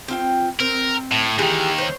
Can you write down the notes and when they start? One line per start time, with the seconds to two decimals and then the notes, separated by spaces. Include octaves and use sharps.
0.08 C4 F4 G5
0.60 C4 A#4
1.12 A2
1.39 D#2 D#3 E3 G#3 G4
1.78 C5 C#5